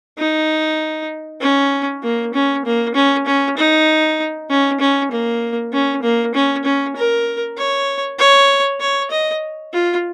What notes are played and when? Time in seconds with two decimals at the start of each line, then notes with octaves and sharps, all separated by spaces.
0.18 D#4
1.41 C#4
2.03 A#3
2.34 C#4
2.65 A#3
2.95 C#4
3.26 C#4
3.57 D#4
4.50 C#4
4.80 C#4
5.11 A#3
5.73 C#4
6.03 A#3
6.34 C#4
6.65 C#4
6.96 A#4
7.57 C#5
8.18 C#5
8.80 C#5
9.11 D#5
9.73 F4